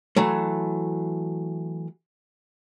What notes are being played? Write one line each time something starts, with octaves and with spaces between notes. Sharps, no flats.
E3 F#3 A3